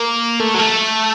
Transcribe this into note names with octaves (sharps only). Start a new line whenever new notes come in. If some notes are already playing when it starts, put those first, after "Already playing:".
Already playing: A#3
A3
F#3
A3